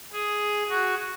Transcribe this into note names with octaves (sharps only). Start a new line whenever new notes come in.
G#4
F#4